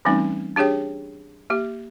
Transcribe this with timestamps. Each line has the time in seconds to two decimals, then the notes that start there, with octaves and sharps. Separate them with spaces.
0.05 E3 G3 A3 C4 C#4 D#4
0.56 D4 G4 G#4 C#5 G5
1.50 A#3 G4